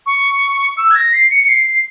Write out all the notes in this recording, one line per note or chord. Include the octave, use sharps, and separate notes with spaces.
C#6
E6
G#6
A#6
C7
C#7
C#7
C7